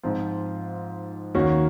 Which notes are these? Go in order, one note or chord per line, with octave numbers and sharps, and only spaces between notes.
G#2 F3 C4 F4
D#2 D#3 A#3 C#4 F#4